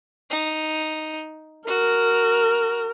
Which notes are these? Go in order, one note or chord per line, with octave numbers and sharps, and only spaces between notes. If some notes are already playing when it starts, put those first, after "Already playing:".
D#4
F#4 A#4